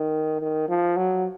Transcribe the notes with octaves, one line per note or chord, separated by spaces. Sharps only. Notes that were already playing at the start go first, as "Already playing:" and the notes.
Already playing: D#3
D#3
F3
F#3